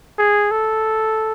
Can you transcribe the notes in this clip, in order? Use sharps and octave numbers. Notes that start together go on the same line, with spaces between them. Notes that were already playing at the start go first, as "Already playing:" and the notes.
G#4
A4